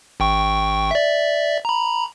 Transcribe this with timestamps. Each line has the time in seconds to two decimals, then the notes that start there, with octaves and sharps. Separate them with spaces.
0.20 G#1 G5 C#6
0.91 D5 E5
1.65 A#5 B5